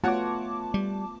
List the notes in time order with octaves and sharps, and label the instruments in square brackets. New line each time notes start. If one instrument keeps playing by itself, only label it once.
[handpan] A3 B3 F4 [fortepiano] F#4 C#5 F#5 [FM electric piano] A5 D6
[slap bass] G3